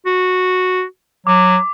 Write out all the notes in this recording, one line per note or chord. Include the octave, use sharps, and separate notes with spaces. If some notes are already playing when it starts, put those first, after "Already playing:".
F#4
F#3 D6